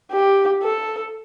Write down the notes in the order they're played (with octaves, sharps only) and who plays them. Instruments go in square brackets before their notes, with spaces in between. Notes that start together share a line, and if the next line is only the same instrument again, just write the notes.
[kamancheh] G4
A4